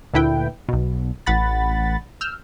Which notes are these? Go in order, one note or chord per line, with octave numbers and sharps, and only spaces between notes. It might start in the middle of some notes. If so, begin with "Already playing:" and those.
D2 A#2 D3 E4 B4 G5
B1 B2
A1 F#5 B5 A6
E6 F6 G6